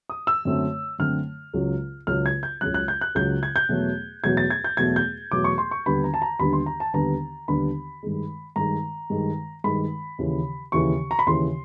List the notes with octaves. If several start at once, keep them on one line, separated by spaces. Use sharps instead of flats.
D#6
E6
F#2 D3 F#3 A3 C4
F#2 D3 F#3 A3 C4 F6
C#2 C#3 F#3
C#2 C#3 F#3 F6
G#6
G6
C#2 C#3 F#3 F#6
F#6
G6
F#6
C#2 C#3 F#3 G6
G#6
G6
E2 B2 F#3 A3
E2 B2 F#3 A3 G#6
A6
G#6
G6
E2 B2 F#3 A3 G#6
G6
E2 B2 F#3 A3 D6
C#6
C6
C#6
D#2 D3 G3 B3 D4 B5
A#5
A5
A#5
D#2 D3 G3 B3 D4 B5
C6
A#5
A5
D#2 D3 G3 B3 D4 A#5
D#2 D3 G3 B3 D4 B5
G2 D#3 G#3
G2 D#3 G#3 A#5
G2 D#3 G#3
G2 D#3 G#3 B5
D#2 C#3 E3
D#2 C#3 E3 C#6
A#5
B5
D#2 C#3 E3 C6